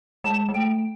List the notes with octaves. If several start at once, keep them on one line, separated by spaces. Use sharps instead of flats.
G#3 A5
G#3
A3 G5